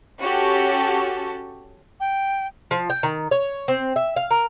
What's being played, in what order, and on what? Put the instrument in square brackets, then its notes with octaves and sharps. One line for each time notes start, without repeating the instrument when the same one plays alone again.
[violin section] C#4 F#4 G4 A4
[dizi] G5
[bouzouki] F3
G5
D#3
C#5
C4
E5
F5
A#4